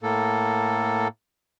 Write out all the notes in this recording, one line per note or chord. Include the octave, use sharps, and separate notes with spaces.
A2 A#3 A4